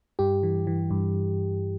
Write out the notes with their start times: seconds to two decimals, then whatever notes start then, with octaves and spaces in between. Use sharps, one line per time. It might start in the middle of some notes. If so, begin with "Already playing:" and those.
0.19 G2 G4
0.43 E3
0.67 E3
0.91 G2